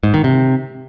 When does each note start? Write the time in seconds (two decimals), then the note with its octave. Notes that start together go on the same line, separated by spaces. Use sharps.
0.03 G#2
0.14 D#3
0.24 C3